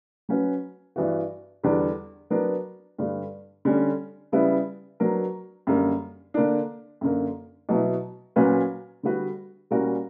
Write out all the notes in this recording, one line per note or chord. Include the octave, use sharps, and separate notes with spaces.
F#3 C#4 F#4 B4
G2 E3 B3 F#4
E2 D3 G3 B3 D4
F#3 B3 D4 A#4
G2 D3 G3
D3 G3 C#4
C#3 G3 B3 E4 B4
F#3 B3 D4 A#4
F#2 D3 G3 A#3
D3 A#3 D4
F#2 D3 A#3
B2 F#3 B3 E4
A#2 F#3 C#4 F#4 B4
D3 G3 B3 F#4 B4
A#2 G3 C#4 F#4 A#4